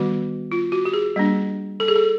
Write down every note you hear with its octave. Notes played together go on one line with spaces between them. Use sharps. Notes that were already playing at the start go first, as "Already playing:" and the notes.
Already playing: D#3 G3 B3 F#4
F4
F#4
G4
G#4
G3 A#3 D4
A4
G#4
A4